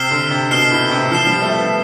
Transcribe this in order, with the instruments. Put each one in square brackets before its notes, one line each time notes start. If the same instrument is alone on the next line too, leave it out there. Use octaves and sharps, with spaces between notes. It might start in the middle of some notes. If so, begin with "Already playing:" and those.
Already playing: [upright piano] C3 [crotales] F6 C7 E7 G7
[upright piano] D3
C3
[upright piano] B2 [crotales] F6 C7 E7 G7
[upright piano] A2
C3
[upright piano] F3 [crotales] F6 C7 E7 G7
[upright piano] G3
A3
B3